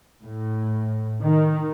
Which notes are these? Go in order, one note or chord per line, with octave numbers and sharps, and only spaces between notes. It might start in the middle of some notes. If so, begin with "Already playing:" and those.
A2
D#3